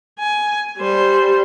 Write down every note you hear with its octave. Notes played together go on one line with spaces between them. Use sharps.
G#5
G3 C5